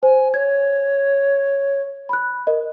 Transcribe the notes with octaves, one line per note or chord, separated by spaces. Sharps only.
C5 G#5
C#5 G#6
B5 F#6
A#4 D#5